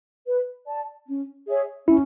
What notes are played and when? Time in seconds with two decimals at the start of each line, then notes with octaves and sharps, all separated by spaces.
0.26 B4
0.66 D5 A5
1.07 C#4
1.47 G#4 C#5 E5
1.87 C#4 E4